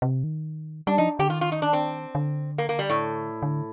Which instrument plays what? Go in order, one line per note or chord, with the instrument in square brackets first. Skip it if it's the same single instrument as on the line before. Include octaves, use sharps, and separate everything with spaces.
[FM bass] C3
D#3
[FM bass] G3 [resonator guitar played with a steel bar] D4
[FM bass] F3 [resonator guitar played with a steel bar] D#4
[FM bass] D3 [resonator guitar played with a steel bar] G4
[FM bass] D#3 [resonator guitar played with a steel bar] F4
[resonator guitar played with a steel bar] F4
D#4
D4
C4
[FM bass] D3
[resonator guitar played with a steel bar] A#3
A#3
G3
A2
[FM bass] D3